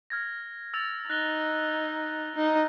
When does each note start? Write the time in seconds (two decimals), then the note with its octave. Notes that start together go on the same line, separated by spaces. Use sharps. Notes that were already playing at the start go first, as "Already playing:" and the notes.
0.10 F6 G#6 A#6
0.74 E6 A6 F7
1.10 D#4 F#6 A#6 G7
2.35 D#4